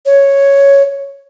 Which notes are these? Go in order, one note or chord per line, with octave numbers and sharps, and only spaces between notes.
C#5